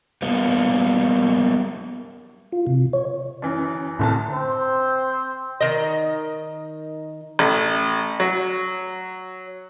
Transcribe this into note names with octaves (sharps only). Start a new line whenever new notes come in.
G3 A#3 B3
F4
C3
C#5
F#2 E3
F#1 C2 A2 D3 A5
C4 C5
D#3 D#5
A1
F#3